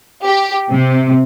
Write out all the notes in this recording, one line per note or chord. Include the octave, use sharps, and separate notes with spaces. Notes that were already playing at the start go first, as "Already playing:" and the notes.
G4
C3